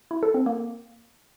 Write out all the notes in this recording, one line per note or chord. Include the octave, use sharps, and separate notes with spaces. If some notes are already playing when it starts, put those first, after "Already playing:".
E4
A4
C4
A#3